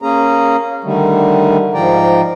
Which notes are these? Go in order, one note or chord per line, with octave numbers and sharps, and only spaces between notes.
A#3 C#4 G#4 A#5
D3 D#3 G3 A3
G#2 F3 D5 G5 A#5